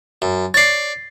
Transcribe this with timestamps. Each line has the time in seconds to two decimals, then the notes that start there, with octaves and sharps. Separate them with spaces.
0.22 F#2
0.54 C#5 D5 A6 C7